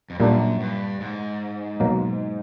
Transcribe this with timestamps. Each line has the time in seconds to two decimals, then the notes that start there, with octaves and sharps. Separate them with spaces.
0.10 F2
0.19 F#2 A#2 G3 A#3 D4
0.60 G2
1.00 G#2
1.80 B2 F#3 A#3